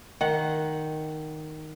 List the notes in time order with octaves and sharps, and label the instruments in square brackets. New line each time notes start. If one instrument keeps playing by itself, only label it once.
[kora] D#3 F#5